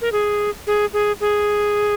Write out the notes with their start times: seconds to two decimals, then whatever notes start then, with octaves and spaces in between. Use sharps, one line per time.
0.01 A#4
0.12 G#4
0.67 G#4
0.93 G#4
1.21 G#4